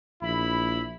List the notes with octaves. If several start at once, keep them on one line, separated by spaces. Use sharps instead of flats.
A#1 E4 B5